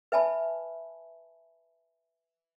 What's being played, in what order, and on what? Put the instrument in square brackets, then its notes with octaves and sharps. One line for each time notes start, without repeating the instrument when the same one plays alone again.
[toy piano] B4 E5 G#5 A5 B5